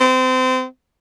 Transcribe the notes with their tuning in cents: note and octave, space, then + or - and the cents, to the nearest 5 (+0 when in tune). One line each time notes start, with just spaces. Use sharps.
C4 -25